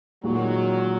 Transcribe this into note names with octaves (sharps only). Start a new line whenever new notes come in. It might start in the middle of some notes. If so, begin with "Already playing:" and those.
A#2 D#3 F#3 G#3 D#4 F#4